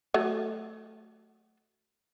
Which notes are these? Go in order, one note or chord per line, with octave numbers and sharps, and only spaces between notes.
F#3 A3